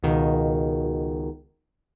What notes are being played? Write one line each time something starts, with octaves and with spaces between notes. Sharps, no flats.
C#2 B2 D#3